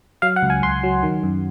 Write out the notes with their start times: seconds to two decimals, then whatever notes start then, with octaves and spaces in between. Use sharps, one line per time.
0.22 F#3 F5
0.36 F#5
0.43 C#2
0.50 G#5
0.62 C#2 C6
0.83 F#3
1.03 D#3
1.23 F#2